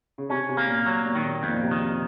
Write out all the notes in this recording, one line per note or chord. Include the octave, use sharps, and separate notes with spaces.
C#3
C3 C#4
C3
A#3
A#2
F#3
A#2
D#3
A#2
F2 A#2
A#2
C3
D#3
C3